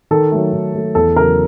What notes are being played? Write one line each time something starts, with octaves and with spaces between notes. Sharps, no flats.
D#3 A4
F#3 A3
D#3
F#3 A3
E2 A4
C#3 F#3 A#4